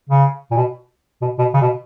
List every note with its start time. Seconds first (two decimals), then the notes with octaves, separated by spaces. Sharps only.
0.09 C#3
0.51 A#2
0.57 B2
1.22 B2
1.39 B2
1.54 C#3
1.61 B2